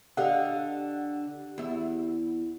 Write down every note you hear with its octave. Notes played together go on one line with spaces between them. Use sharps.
D3 G4 D#5 F5 F#5
E2 E4